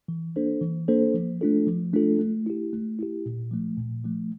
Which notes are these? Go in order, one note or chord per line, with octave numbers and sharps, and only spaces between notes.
E3
A#3 D4 A4 C5
E3
A#3 D4 A4 C5
F3
A3 D4 F4 A4
F3
A3 D4 F4 A4
A3
E4 G4
A3
E4 G4
A#2
F3 A3
A#2
F3 A3